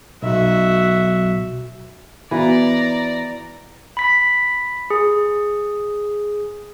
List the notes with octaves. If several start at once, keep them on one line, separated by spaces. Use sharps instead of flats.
B1 F#4 E5
E3 B3 F#4 B4 D5 F5 A#5
B5 B6
G#4